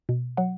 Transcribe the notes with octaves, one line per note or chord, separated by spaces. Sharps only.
B2
F#3 F#5